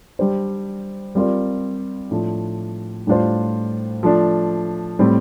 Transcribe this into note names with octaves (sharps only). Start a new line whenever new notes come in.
G3 D4 G4 C5
G3 C4 F4 A#4 D5
A2 F3 A3 D4
A2 G3 D4 F4 C5
F3 A3 D4
A2 G3 C4